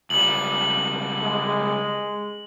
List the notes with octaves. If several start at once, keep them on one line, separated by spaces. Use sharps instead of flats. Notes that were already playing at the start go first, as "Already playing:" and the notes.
C#2 G3 F#7
G#3